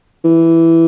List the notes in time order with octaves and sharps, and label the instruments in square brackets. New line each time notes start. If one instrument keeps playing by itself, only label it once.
[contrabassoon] E3